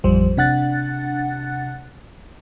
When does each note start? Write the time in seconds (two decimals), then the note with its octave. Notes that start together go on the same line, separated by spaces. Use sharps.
0.04 A1 F2 F3 G3 C5
0.37 C3 D4 F#5 F#6 A6